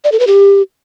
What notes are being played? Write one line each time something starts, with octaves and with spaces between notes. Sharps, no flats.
D5
A4
B4
G4